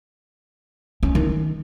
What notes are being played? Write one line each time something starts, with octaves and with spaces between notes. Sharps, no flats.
C#4
D#3